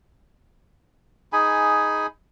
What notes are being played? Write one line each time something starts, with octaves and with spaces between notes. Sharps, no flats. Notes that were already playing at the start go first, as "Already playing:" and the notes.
D#4 G#4 G#5 B5